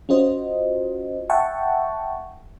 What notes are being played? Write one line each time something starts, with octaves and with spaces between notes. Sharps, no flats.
C#4 F4 F#4 C5 D#5
E5 F#5 G5 A5 C#6